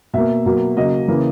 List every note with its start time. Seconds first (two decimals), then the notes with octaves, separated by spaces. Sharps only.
0.13 B2 A#3 E5
0.46 B2 F#3 A#3
0.76 C#3 F#3 A#3 D#5
1.08 C#3 E3 A#3